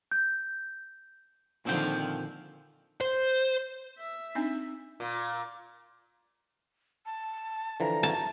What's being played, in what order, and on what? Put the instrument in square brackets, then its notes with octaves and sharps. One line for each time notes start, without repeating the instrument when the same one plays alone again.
[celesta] G6
[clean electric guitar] A#2 C4 G5 [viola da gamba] D3 D#3 F3
[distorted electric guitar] C5
[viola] E5
[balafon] C4 D4 D#4
[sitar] A#2
[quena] A5
[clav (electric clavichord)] D3 E3 F3 [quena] A#5
[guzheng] A5